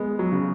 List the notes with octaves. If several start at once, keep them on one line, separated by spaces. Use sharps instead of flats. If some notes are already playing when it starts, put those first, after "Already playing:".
Already playing: G#3 B3
F#3
C#3